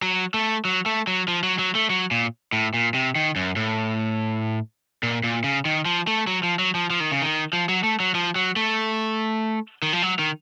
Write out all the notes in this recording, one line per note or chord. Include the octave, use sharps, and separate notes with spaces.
F#3
A3
F#3
A3
F#3
F3
F#3
F#3
A3
F#3
A#2
A2
A#2
C3
D#3
F#2
A2
A#2
A#2
C#3
D#3
F3
A3
F#3
F3
F#3
F3
F3
D#3
C#3
D#3
F3
F#3
A3
F#3
F3
F#3
A3
D#3
F3
F#3
D#3